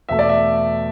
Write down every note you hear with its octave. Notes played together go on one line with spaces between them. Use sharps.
E2 B2 A3 E5
D5
E5